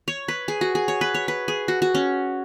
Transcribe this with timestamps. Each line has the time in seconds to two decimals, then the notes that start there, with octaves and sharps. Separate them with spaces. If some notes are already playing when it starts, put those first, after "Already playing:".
0.08 C#5
0.28 B4
0.48 G#4
0.61 F#4
0.75 G#4
0.88 C#5
1.01 B4
1.14 C#5
1.28 B4
1.48 G#4
1.68 F#4
1.82 F#4
1.95 C#4